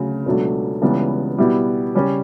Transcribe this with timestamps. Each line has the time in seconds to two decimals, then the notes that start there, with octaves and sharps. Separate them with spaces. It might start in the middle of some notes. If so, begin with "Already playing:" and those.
Already playing: D2 C#3 F#3
0.26 C#2 B2 F#3 A3 D4
0.82 C#2 C#3 E3 G3 B3
1.38 B2 G3 B3 E4 G4
1.95 C#3 G3 C#4 G4